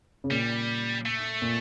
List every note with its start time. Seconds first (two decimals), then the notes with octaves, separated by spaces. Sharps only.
0.24 C#3
0.31 A#2 G3
1.06 A3
1.42 A#2